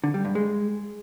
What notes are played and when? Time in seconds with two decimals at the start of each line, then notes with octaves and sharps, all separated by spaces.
0.04 D3
0.14 G3
0.25 G2
0.35 G#3